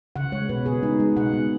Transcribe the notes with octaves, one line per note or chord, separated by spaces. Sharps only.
C#3 F#5
G#3 C#5
B2 B4
B2 G#4
G#3 D#4
G#3
B2 F#5
G#3